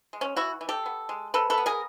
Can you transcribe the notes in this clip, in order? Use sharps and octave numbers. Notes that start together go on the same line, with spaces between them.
G#3
C#4
E3 E4 F#4
E3
G4 A4
B3
G#3
C3 A4 B4
A4 B4
B3
G#4 A#4